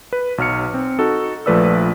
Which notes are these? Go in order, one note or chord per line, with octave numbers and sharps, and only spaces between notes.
B4
B1 F#3 F6 C#7
C4
D#4 F#4 A4
A#1 F3 A3 B4 D5 E6